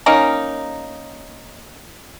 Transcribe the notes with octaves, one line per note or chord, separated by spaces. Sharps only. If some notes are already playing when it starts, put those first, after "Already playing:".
A#3 C#4 D#4